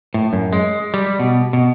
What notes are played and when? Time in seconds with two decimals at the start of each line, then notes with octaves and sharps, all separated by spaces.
0.14 A2
0.33 F#2
0.53 G#3
0.94 G3
1.20 B2
1.53 B2